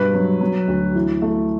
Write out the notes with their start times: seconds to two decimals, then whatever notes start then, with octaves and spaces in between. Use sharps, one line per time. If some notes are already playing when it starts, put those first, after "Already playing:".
Already playing: G2 B2 B4
0.14 F#3
0.41 F#3
0.68 D2
0.95 E3
1.22 A3